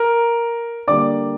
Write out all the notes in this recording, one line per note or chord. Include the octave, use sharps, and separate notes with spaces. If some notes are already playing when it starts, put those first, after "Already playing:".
Already playing: A#4 A#5
D3 G3 A#3 D5 D6